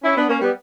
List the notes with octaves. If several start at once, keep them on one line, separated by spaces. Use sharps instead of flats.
C#4 E4
B3 D4
A#3 C#4
G3 B3